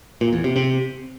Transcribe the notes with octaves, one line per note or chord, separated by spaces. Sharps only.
A#2
E2
C3
C3